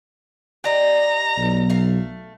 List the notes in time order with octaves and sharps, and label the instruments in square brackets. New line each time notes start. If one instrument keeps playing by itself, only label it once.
[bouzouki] G4 D5 D#5 [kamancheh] A#5
[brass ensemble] B1
[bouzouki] A3 F5